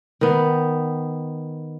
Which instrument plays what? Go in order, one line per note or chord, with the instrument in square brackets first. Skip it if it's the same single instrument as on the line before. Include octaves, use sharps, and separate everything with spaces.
[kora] D#3 B3